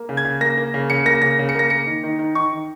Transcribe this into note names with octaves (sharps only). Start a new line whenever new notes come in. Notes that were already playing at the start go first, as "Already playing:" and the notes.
Already playing: A#3
C#3
G#6
C#3
A#3 A#6
A#3
C#3
C#3 C#7
A#3 A#6
C#3 A#6
C#3
C#7
A#3 A#6
A#3 C#7
D#3
D#3
D#3
D#3 C#6
D#3